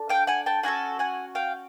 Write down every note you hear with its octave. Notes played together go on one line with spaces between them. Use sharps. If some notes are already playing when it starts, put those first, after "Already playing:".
Already playing: D4 A4
F5 G5
F#5 G#5
G5 A5
C#4 F#4 A4 F#5 G#5
F#5 G#5
F5 G5